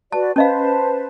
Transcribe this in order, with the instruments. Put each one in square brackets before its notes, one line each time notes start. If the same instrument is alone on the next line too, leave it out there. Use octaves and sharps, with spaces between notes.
[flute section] F#4 B4 D5 [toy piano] A5
[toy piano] C#4 D#5 F5 [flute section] B4 C5 A5